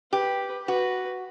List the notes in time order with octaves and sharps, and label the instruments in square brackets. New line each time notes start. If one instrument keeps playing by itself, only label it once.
[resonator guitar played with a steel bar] G4 [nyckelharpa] B4
[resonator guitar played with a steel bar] F#4 [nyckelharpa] B4